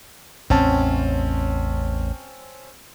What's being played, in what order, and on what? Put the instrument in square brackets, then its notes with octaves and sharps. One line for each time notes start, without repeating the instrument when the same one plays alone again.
[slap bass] A1 E2 [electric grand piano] C4 C#4 A5